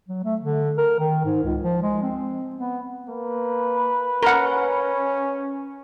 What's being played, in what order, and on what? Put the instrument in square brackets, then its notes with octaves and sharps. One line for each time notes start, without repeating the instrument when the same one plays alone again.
[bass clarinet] F#3
A3
D3
A#4
D#3
G#2
C#2
F3
G#3
C4
B3
[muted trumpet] A#3 [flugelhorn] B4
[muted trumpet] C#4 [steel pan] A#4 F#5